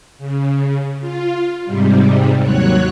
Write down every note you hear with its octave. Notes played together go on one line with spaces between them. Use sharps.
C#3
F4
G#2 C3 G3
D#2 F#3 C#5 F#6